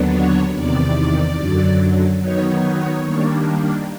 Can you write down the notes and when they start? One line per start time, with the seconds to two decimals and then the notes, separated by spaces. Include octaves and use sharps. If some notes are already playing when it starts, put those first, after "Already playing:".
Already playing: D#2 D3 F#3 B3 D4
0.10 C#5
0.52 E2 C3 D#3 D5
1.36 F#2 D3 F#3
2.20 D#3 F#3 B3 D#4 C#5
2.61 C#5
3.03 D#3 G3 A#3 D4